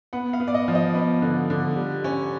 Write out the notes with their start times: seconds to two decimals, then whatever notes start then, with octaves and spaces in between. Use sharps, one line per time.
0.13 B3 F#5
0.33 F5
0.40 B3
0.48 D5
0.54 D#5
0.68 F3
0.75 D#5
0.94 B3
1.22 D3
1.50 D3
1.76 G3
2.04 C#4